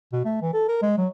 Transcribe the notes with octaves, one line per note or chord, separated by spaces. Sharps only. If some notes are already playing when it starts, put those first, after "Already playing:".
B2
A3
E3
A4
A#4
G#3
F#3